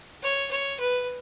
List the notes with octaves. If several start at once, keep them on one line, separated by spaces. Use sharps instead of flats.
C#5
C#5
B4